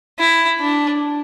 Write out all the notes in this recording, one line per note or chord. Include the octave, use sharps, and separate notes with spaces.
E4
D4